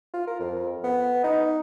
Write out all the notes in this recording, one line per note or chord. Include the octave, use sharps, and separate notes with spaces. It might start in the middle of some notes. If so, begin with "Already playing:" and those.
F4
A#4
F2
B3
D#4